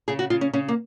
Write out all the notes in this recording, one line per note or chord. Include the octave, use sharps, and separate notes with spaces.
C#3 G#4
F#4
C#3 F4
C#4
C#3 C#4
A#3